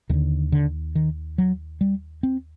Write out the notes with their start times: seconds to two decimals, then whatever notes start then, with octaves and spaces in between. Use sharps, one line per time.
0.09 D#2 D#3
0.14 D3
0.52 D3
0.95 D#3
1.38 F#3
1.81 G3
2.23 C4